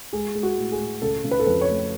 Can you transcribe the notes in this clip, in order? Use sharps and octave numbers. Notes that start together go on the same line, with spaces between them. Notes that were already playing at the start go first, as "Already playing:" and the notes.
G#3 G#4
G#3
F#4
A2
G#4
A2
C#3 A4
C#3
B4
A4
F2 B4
C#5
A3